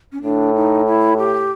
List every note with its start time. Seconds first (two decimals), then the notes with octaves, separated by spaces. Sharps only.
0.12 C#4
0.22 A2 D4
0.54 D#4
0.86 E4
1.17 G4